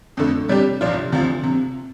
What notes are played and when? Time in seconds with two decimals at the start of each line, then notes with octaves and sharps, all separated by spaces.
0.17 F2 D3 A3
0.49 C3 G3 D4 G4
0.81 C2 C3 F3 D4 F4
1.12 D2 C3 F3
1.44 C3